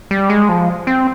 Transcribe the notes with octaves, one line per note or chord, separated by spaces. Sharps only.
G3
G#3
F3
C4